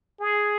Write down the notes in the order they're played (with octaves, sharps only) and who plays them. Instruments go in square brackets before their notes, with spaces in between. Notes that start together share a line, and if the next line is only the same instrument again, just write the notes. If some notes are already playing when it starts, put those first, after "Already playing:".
[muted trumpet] G#4